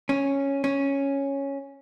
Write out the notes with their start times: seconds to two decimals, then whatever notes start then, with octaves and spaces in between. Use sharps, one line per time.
0.09 C#4
0.64 C#4